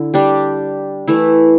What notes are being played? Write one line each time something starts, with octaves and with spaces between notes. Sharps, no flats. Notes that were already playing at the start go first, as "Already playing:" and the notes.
Already playing: D3 E4
G3 D4 G4
E3 A3 E4